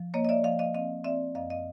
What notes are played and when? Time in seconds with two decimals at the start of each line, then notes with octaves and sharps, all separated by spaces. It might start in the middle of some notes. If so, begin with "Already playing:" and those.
Already playing: F3
0.14 A#3 C#5 D#5
0.25 D#5
0.29 D5 E5
0.44 F3 D#5 F5
0.59 D#5 F5
0.74 C4 D#5 F5
1.04 C4 D5 E5
1.35 F#2 D#5 F5
1.50 D#5 F5